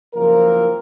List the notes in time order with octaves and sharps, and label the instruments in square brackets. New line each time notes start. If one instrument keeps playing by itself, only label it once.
[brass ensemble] F#1 F3 A#3 C4 A#4